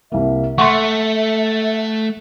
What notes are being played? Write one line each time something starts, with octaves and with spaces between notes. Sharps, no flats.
C2 A#3 E5
A3 F#5 C6 C#6